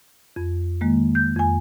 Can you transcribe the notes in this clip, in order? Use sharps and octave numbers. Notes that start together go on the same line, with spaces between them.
F2
D#3 G#3 A#3
G6
F2 G#5